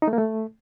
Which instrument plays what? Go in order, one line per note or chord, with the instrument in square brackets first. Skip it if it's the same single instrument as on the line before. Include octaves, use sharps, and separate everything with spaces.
[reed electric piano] D#4
A3
A#3
A3